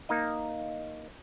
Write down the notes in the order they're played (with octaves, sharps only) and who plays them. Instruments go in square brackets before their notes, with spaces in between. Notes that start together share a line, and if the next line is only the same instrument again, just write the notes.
[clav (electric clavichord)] A#3 D#4 D#5